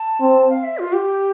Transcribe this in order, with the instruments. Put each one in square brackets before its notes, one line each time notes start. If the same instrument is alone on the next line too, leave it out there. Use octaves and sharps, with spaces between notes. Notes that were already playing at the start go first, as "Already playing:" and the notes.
Already playing: [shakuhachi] A5
[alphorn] C4
[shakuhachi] F5
E5
F4
G4